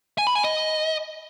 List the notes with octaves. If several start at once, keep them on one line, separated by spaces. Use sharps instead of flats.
G#5
B5
G#5
D#5